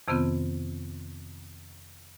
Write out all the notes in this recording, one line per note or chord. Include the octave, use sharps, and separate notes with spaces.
F2 C3 D#3 B3 C4 F4